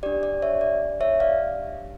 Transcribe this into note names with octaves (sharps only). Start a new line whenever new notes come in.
D4 G4 D5
D5
C#5 E5
D5
C#5 E5
D5 F5